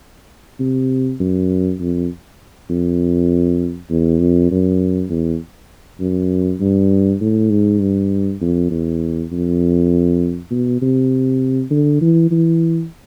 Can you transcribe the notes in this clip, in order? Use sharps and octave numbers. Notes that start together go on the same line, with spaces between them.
C3
F#2
F2
F2
E2
F2
F#2
E2
F#2
G2
A2
G#2
G2
F2
E2
F2
B2
C3
D3
E3
E3